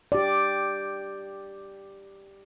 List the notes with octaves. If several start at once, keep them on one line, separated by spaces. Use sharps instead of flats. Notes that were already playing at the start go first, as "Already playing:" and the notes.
G4 D5